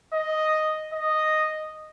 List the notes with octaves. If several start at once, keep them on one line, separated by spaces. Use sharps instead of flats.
D#5
D#5